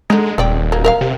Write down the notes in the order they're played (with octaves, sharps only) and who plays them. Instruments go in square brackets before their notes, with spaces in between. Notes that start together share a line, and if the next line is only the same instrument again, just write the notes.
[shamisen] D3 D#4 [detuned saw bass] G#3
[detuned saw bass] D#1 [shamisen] C4 D5 G5
[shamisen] F#3 A#3
A#4 E5 F5
[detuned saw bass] C3